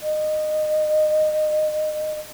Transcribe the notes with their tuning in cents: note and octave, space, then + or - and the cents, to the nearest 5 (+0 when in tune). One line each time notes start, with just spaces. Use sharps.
D#5 -25